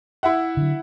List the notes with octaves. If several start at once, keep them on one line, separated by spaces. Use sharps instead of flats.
E4 E5 F#5
D3 F#3